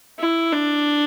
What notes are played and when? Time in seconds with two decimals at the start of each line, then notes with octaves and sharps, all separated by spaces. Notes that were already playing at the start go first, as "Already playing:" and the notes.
0.19 E4
0.53 D4